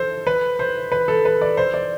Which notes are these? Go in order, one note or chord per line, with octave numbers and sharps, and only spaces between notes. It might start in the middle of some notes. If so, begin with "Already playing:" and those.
Already playing: A4 C5
B4
C5
B4
A4
B4
D5
C5
D5